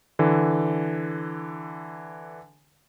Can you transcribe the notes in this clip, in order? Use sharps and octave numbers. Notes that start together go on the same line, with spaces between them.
D3 E3